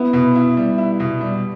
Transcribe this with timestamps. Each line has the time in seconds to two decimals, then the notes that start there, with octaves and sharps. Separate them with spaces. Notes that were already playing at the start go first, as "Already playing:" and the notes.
Already playing: B3 E4
0.13 B2
0.35 E4
0.57 G3
0.78 E4
1.00 B2
1.21 G3